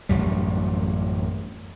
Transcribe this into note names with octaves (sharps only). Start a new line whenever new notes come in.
A1 F#2 G3